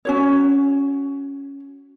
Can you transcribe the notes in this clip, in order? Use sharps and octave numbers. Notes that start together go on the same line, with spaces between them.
C#4 F#4 C#5